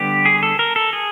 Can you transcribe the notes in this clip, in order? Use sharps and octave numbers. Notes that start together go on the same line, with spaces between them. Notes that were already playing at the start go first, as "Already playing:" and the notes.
Already playing: D3 G3 B3 G4
G#4
A4
A#4
A4
G#4